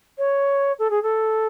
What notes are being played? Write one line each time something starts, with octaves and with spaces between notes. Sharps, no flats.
C#5
A4
G#4
A4